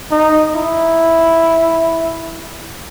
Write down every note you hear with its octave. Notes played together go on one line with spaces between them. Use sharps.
D#4
E4